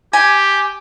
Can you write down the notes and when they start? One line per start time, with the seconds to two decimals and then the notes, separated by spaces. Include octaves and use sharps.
0.13 G4 G#5